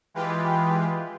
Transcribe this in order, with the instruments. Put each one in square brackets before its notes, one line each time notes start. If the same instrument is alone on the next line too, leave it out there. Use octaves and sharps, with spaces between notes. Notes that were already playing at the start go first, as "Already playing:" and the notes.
[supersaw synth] E3 G#3 F4 G4 B4